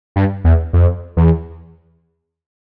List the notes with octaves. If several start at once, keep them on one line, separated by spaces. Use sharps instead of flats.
G2
E2
F2
E2